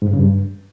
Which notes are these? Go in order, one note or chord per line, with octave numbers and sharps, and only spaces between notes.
G#2
G2
C#3
G2